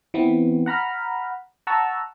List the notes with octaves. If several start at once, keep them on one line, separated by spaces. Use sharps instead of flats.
E3 B3 C4
F#5 A#5 B5 F6
F#5 A5 A#5 C#6 E6